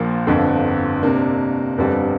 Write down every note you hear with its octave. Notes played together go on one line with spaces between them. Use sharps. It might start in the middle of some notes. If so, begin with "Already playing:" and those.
Already playing: A#1 A#2 F3 A#3
G1 F2 D3
C3 A#3 D4
G1 F2 D3 G3